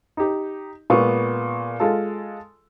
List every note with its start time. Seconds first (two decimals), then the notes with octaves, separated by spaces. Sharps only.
0.17 D#4 G4
0.90 A#2 G#3 B3 C#6
1.80 G#3 F4 A4